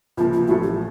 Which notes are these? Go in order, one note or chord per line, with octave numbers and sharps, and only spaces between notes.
C#2 C3 F3 A#3 F4
F4
A1 A2 F3 A3 F#4
G4